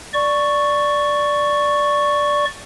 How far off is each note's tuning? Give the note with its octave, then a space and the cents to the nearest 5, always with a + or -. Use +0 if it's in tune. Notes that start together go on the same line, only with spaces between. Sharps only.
D5 +0 C#6 +0